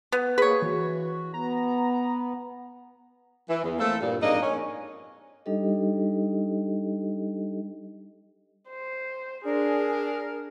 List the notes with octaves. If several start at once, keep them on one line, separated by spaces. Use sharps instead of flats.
B3
A#3 G#4 B4 C#5
E3 F#4
B3 A#5
E3
E2
A3 A#3 C4 A4
G2 A#2
F2 G#2 A#3 D4 D#4 D#5
C#4
G3 D4 D#4 G4 A4 D#5
C5
D4 G#4 A#4